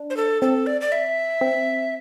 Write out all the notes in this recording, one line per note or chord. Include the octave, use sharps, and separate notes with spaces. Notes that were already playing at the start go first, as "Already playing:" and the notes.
Already playing: D4
C5
A4
C4 A4
D5
D5
E5
C4